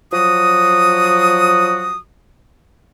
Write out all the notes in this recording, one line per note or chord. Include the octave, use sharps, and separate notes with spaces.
F3 F#3 F#4 D#6